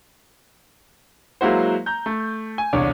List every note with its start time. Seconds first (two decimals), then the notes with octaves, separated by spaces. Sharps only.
1.41 F#3 G#3 A#3 E4 F#4 C5
1.86 A#5 G6
2.06 A3
2.58 G#5
2.73 E1 C2 D3 C#5 D6